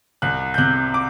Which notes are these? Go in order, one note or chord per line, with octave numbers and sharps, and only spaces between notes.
C2 F#6
G6
C3 F#6
D6